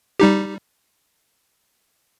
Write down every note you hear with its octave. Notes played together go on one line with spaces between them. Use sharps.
G3 D#4 G4